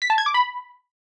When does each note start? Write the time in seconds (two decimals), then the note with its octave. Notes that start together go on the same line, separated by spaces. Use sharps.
0.02 B6
0.10 A5
0.18 G#6
0.26 D6
0.34 B5